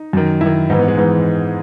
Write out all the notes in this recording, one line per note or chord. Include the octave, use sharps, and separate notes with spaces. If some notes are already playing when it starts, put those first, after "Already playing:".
Already playing: D#4
F#2 D#3
F#2 D#3 E4
G#2 E3 D#4
B3
G#3
G#2 E3